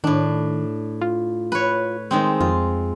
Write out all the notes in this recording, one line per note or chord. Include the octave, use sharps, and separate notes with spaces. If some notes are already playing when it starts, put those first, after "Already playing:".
A2 D#3 D4
F4
B4 C#5
D#3 G#3 C4
F2 F4